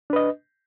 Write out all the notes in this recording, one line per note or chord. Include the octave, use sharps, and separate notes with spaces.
D4 B4 D#5